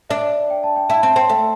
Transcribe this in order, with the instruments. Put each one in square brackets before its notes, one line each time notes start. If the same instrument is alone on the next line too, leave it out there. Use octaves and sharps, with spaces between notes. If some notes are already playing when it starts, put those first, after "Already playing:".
[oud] D4 [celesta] E5
[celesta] G5
A5
G5
[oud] E4 [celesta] A5
[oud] C4 [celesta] A5
[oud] C4 [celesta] G5
[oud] A3